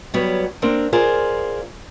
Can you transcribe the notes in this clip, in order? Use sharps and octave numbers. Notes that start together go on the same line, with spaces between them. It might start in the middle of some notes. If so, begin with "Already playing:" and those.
F#3 G3 B3 C#5 D5
A#3 C4 D4 A#4
F4 G#4 A#4 C5 D5